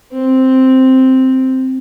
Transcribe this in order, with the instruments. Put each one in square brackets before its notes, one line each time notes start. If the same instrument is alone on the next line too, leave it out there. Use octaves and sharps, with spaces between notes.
[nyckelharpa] C4